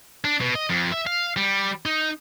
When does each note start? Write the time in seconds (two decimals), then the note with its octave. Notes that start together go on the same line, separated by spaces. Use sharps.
0.24 D4
0.41 B2
0.55 D#5
0.70 F2
0.92 E5
1.07 F5
1.37 G3
1.86 D#4